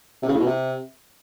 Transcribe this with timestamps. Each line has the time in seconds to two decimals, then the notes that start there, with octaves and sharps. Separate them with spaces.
0.22 C3
0.28 C#3
0.34 A2
0.40 B2
0.46 C3